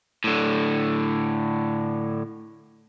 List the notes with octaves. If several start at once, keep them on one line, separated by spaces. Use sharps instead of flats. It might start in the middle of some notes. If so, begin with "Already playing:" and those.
A2 D3